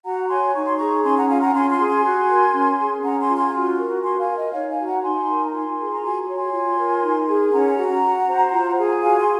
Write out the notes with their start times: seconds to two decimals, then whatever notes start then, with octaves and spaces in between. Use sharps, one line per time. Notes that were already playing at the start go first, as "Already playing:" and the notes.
0.04 F#4 F#5 A#5
0.29 C#5 G#5 C6
0.54 D#4 C#6
0.65 C6
0.76 G#4 A#5 C#6
1.03 C#4 G#5 C6
1.16 F#5 A#5
1.29 F4 F5 G#5
1.40 F#5 A#5
1.54 C#4 G#5 C6
1.70 G#5 C6
1.78 G#4
1.87 G#5 C6
2.03 F#4
2.29 A#4
2.53 C#4
2.79 G#4
3.03 C#4 F#5 A#5
3.20 G#5 C6
3.28 F4
3.36 G#5 C6
3.54 F#4
3.78 A#4
4.02 F#4 G#5 C6
4.19 F5 G#5
4.28 A#4
4.36 D#5
4.53 D#4 C#5 F5
4.69 F5 G#5
4.78 F#4
4.86 F#5 A#5
5.02 D#4 G#5 C6
5.28 A#4
5.44 A#5
5.52 F4 G#5 C6
5.78 G#4
5.90 A#5
6.02 F#4 G#5 C6
6.27 C#5
6.36 G#5 C6
6.52 F4
6.77 A#4
7.02 D#4
7.27 G#4
7.52 C#4 F#5 A#5
7.77 F#4
8.02 F#4
8.27 C5
8.52 F4
8.77 G#4
9.02 F#4 F5 G#5
9.18 G#5 C6